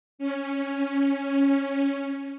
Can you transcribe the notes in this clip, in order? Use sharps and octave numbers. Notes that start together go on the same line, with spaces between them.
C#4